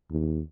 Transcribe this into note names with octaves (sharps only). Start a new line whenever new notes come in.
D#2